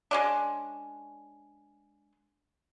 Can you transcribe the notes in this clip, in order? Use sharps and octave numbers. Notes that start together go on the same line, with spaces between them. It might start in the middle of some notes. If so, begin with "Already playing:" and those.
G#3 C#4 D4